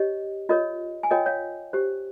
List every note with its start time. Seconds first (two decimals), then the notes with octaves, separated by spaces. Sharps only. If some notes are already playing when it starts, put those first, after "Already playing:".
Already playing: G4 C#5 D#5
0.49 F4 A#4 C#5 D#5
1.03 G#5
1.11 F4 A#4 C#5 D#5 G5
1.26 C#5 F5
1.73 G4 C5